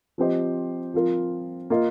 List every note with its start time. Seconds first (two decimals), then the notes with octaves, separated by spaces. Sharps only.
0.18 F3 C4 G4 C5 D#5
0.94 F3 C4 F4 A#4
1.70 A#3 F4 D#5